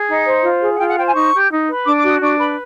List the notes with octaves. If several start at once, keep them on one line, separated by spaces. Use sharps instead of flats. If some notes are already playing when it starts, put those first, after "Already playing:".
Already playing: G#4
D#4
C5
F4
G#4
F#5
F4 G5
F#5
C5 G5
G#5
D#4 C#6
G4
D#4
B4
D4 D6
D6
F#4
D#6
D4 C#6
B4 B5